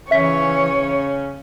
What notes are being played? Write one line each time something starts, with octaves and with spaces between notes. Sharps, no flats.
C#3 E3 C#4 C#5 E5 B6